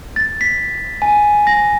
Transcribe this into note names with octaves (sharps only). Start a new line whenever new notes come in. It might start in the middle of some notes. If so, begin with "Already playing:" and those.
A6
B6
G#5
A#6